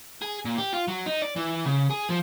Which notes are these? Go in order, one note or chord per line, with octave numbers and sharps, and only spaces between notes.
G#4
A#2
G4
F4
F#3
D#4
D5
E3
C#3
G#4
F3